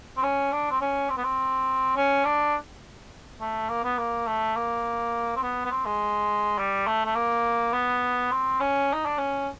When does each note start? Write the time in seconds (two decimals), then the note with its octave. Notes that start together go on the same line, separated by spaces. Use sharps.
0.17 C4
0.23 C#4
0.52 D4
0.71 C4
0.81 C#4
1.10 C4
1.17 B3
1.24 C4
1.97 C#4
2.25 D4
3.41 A3
3.69 A#3
3.84 B3
3.98 A#3
4.27 A3
4.56 A#3
5.36 C4
5.43 B3
5.65 B3
5.71 C4
5.86 G#3
6.58 G3
6.87 A3
7.05 A3
7.16 A#3
7.73 B3
8.31 C4
8.60 C#4
8.93 D#4
9.06 D4
9.18 C#4